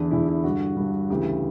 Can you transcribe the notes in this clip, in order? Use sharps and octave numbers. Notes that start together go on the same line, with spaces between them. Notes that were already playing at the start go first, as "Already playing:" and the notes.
Already playing: E2 D3 D4
E2 D3 E4
E4
G2 D3 F#4
G2 D3
D2 C#3 E3 G4